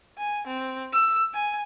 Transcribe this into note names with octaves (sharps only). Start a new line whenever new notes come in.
G#5
C4
E6
G#5